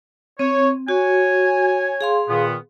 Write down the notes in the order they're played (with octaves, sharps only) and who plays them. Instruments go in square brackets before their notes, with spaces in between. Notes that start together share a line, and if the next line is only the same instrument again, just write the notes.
[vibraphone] C4 [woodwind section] C#5
[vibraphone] F#4 [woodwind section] C#5 G#5
[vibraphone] G#4 F5 C6
[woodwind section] A#2 D#3 B3